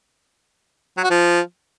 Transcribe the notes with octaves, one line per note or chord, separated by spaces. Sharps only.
F#3
F#4
F3